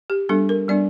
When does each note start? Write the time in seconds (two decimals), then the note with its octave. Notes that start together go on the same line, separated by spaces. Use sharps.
0.10 G4
0.29 G3 B3 D4 A4
0.49 A#4
0.68 G3 B3 D4 D5